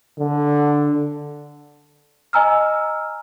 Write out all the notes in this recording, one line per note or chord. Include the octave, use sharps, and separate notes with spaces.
D3
D#5 G#5 A#5 E6 F6